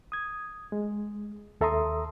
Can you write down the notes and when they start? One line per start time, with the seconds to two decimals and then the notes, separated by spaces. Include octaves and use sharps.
0.12 D#6 G#6
0.72 G#3
1.61 D#2 A4 E5 A#5 C6 D#6